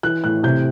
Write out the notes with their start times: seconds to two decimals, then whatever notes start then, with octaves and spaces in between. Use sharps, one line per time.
0.03 E3 F#6
0.24 A2 F#6
0.43 C3 G6